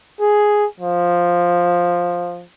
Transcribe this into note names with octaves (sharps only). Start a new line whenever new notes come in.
G#4
F3